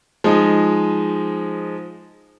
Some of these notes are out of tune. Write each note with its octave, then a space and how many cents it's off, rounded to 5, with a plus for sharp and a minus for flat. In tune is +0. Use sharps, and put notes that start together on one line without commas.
F3 +0 G#3 +0 D#4 +0